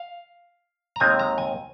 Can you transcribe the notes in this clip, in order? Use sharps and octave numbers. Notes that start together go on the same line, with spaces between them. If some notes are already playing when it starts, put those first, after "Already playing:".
Already playing: F5
A#5
D#2 D#3 G#3 C4 G#5
A#5
G#5